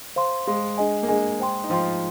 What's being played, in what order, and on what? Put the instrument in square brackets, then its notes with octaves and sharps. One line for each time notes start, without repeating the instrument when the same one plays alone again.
[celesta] C5 F5 C6
[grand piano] G#3 [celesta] C5 F5 C6
[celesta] D4 G#4 D#5 G#5
[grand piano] A#3
[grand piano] G#3 [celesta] D4 G#4 D#5 G#5
[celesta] C5 G5 C6
[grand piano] D#4
[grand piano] F3 F4 [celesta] C5 G5 C6